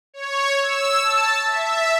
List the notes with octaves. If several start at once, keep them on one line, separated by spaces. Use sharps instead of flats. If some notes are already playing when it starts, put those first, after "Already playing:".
C#5
E6
A5
E5